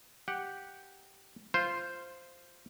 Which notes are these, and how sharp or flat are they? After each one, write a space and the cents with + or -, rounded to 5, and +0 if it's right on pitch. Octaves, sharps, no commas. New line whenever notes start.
G4 +0 F#5 +0
F4 -10 C5 +0